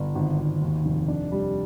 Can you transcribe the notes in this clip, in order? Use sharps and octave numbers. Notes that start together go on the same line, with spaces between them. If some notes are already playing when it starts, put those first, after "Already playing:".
Already playing: G1
G#1
G#1
D#2
F1
D4
G3